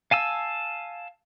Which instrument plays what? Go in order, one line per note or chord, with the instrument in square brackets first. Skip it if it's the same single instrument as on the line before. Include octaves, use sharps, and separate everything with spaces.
[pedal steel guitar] F5 G#5 A5 E6